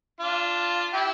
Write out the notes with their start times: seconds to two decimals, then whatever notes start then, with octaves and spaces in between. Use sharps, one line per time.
0.20 D4 F4
0.93 E4 G4